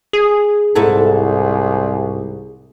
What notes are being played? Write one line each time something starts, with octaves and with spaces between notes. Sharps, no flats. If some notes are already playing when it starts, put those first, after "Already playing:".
G#4
C2 G#2 E4 A4